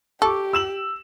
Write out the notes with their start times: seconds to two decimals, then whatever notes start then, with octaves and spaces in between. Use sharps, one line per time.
0.22 G4 A4 C#6 D6
0.53 E6 E7 F#7